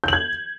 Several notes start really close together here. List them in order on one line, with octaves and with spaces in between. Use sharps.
G6 F#7 G#6